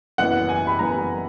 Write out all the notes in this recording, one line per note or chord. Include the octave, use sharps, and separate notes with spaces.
F#1 F#2 E3 B3 F#5
G#5
B5
F#1 F#2 E3 B3 A#5